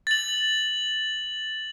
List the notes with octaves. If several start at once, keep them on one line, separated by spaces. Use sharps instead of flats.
A6 F#7